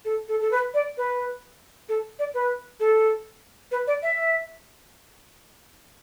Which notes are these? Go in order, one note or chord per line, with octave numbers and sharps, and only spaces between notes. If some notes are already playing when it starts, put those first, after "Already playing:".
A4
A4
A4
B4
D5
B4
A4
D5
B4
A4
B4
D5
E5